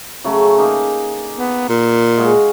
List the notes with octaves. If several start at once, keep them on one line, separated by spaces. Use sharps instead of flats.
C#3 F#3 A3
A#3 D#4 G#4
B3
A#2
G#3 F#4 F5